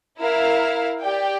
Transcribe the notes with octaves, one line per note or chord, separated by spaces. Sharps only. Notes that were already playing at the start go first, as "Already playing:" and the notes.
E4 A#4 F5
G4 D5 G5